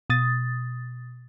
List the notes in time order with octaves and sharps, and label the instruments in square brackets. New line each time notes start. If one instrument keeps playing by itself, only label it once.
[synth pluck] B2 D#6 A6